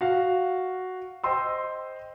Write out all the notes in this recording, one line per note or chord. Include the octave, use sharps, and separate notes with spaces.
F#4 F5
C5 D#5 G5 C6 E6